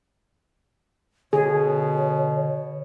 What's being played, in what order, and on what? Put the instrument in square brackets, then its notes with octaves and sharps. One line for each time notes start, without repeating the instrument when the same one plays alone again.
[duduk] B2 [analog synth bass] D3 [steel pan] G#4 [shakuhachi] C#5